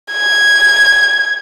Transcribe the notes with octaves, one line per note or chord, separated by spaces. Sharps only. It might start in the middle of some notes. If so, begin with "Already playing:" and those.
G#6